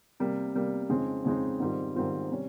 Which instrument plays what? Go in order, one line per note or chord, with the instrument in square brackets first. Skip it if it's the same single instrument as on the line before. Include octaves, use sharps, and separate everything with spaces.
[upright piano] C3 G3 A#3
C3 G3 A#3
F2 C#3 G#3 C4 D#4
F2 C#3 G#3 C4 D#4
G#2 D#3 G3 C4 F4
G#2 D#3 G3 C4 F4
C3 G3 C#4